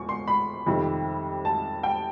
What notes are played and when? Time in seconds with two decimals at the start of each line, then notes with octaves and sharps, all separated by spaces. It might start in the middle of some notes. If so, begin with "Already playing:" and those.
Already playing: E2 F3 C#6
0.09 C6
0.28 B5
0.66 F2 C3 D#3 G3
1.45 A5
1.83 G5